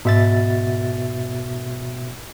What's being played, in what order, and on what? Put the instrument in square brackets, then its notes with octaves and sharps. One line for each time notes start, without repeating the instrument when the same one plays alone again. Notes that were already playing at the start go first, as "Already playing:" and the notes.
[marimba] G#2 [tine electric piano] B2 E5 A6